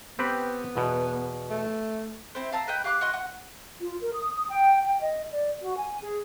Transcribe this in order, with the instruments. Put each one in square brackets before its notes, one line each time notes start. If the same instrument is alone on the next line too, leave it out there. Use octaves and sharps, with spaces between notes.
[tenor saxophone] B3 [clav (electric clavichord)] C4 G4 B4
[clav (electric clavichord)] E2 B2
[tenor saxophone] A3
[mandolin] C4 E4 C5
F5 A5 A#5 E6
B4 D#5 G5 B5
G4 F5 D6 F#6
F#4 D#5 C6
F#5
[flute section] F4
A#4
D#6
D#6
G5
G5
D#5
D5
F#4
G#5
G#4